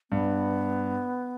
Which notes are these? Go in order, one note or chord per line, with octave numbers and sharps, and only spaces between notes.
G2 B3